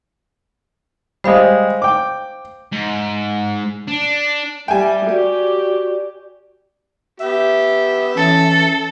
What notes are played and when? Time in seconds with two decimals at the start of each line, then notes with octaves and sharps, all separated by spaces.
1.24 G3 G#3 C5 F5 D#6
1.82 G5 D6
2.73 G#2
3.88 D4
4.68 G3 E5 G5 G#5
5.09 F#4 G4 D5
7.20 B3 G4 E5
8.17 E3 C#4 A4